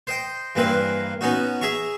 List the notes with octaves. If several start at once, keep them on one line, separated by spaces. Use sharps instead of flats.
C5 D#5 G5
G2 E3 A#3 C4 B4
B3 C#4 D#4 F#4
G#4 E5 A#5 C#6